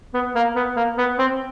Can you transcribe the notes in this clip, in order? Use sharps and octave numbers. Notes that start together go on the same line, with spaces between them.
B3
A#3
B3
A#3
B3
C4